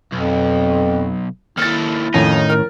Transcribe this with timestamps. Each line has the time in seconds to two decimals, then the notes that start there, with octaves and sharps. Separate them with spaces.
0.12 B1 F2
1.58 D#2 E4 A4 F6 A6
2.14 F2 A2 D#3 C#4 D#4
2.49 A#4 F6